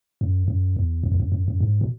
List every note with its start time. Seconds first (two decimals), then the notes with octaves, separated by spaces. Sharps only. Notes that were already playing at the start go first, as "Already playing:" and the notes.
0.21 F#2
0.48 F#2
0.76 E2
1.03 F#2
1.12 E2
1.20 F#2
1.32 F#2
1.48 F#2
1.60 G#2
1.81 B2